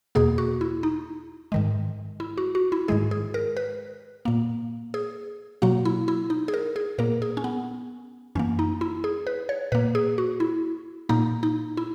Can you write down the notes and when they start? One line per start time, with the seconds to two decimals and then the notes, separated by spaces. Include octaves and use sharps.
0.15 E2 B2 A#3 G#4
0.38 F#4
0.61 E4
0.83 D#4
1.52 G#2 D#3 G#3
2.20 E4
2.38 F#4
2.55 F#4
2.72 E4
2.88 G#2 D#3 G#3 G#4
3.11 G#4
3.34 A#4
3.57 B4
4.25 A#2 A#3
4.94 G#4
5.62 B2 F#3 A#3 F#4
5.85 E4
6.08 E4
6.30 D#4
6.48 G#4
6.54 A#4
6.76 G#4
6.98 A#2 A#3 A#4
7.22 G#4
7.37 C#4
7.44 B3
8.35 F#2 E3 A#3 C#4
8.59 D#4
8.81 E4
9.04 G#4
9.27 B4
9.49 C#5
9.72 A#2 A#3 B4
9.95 G#4
10.18 F#4
10.40 E4
11.09 A#2 A#3 D#4
11.43 D#4
11.77 E4